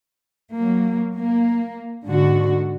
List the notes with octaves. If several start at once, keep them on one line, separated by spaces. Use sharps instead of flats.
F#3 A#3
A#3
G#2 D3 F#4